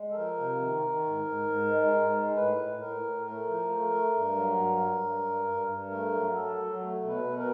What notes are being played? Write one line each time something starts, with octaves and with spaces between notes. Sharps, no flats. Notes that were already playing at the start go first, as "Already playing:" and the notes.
Already playing: G#3
A4
F3 A#4
C3
D#3
D#3
G#2
G#2
G#2
G#3
G#2
G#3
A2 B4
A2
A2 A#4
A2
A3 A#4
F3
A3
A3
G2
F#3
G2
G2
G2
G2
G2
G2
A3 A#4
F#3
F#3 A4
F#3
A3
B2
B4
B2
A#4